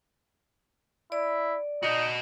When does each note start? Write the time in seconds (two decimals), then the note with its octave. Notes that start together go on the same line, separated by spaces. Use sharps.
1.12 E4 D5
1.83 D#4 F#4 D#5